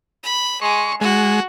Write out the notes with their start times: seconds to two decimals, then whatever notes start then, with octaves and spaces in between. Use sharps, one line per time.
0.23 B5
0.62 G#3 C#6
1.01 G#3 F#4